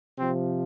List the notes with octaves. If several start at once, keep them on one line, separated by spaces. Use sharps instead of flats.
C3 F3 C4